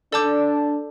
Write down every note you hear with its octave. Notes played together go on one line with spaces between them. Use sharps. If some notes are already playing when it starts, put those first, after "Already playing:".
D4 A4 D5 A5 D6 G6